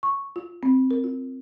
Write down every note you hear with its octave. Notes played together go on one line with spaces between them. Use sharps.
C#6
F4
C4
A#4
F4